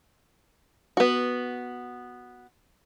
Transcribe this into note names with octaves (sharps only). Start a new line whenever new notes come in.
B3 F#4